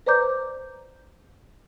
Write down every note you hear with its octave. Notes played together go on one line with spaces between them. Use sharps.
B4 C5 D5 A#5 D6 G6